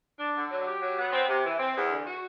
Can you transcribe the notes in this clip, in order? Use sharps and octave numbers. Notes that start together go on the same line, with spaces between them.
D4
D3
F#3
G4
F#3
B3
C4
C3
E3
C4
E2
D3
F#4